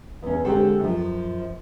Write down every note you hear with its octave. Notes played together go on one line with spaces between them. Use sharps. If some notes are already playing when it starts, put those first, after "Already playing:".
E2 C#4
D3 G#3 C4 F#4 G4 A4
F#2 F3